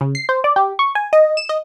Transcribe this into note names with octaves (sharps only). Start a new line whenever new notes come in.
C#3
C7
C5
D5
G4
C#6
G#5
D#5
E7
D#5